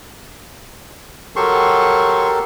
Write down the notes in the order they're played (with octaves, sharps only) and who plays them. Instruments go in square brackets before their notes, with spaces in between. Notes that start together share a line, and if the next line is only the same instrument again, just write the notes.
[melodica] F#3 C6 C#6 [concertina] G4 A4 A#4